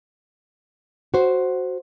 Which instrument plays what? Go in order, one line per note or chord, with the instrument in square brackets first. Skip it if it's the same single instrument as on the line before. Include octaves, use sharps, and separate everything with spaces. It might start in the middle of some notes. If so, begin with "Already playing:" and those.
[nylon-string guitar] F#4 C5